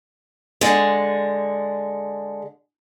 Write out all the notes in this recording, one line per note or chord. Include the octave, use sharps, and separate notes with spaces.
D3 G#3